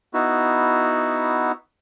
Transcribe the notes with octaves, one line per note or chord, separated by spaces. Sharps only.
B3 D#4 E4 F#4